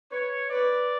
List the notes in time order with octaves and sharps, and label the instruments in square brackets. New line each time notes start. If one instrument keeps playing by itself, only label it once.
[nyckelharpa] B4 [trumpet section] C#5
[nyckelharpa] B4 [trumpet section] D5